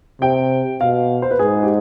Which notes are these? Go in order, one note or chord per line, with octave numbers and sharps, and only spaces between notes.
C3 G5
B2 F5
C5
B4
G#2 G#4
G4